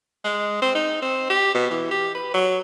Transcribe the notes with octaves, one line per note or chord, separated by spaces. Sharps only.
G#3
C4
D#4
C4
G4
B2
E3
G4
B4
F#3